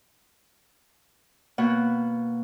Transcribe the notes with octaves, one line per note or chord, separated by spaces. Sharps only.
B2 A#3 F#5